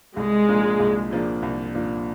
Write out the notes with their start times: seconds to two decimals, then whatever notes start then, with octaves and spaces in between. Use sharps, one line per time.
0.16 C2 G#3
0.48 A#2 F3 A#3 D4
0.80 C2
1.11 A#2 F3 A#3 D4
1.42 C2
1.74 A#2 F3 A#3 D4